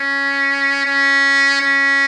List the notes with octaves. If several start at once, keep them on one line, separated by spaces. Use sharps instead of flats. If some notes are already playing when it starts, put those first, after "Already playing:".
Already playing: C#4
C#4
C#4